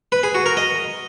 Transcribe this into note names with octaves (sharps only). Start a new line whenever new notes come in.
B4
G#4
F#4
A#4
D#5